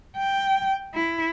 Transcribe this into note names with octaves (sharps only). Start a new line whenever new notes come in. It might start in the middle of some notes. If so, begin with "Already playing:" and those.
G5
E4